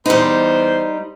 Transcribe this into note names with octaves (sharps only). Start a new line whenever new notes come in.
E2 G3 D#4 C5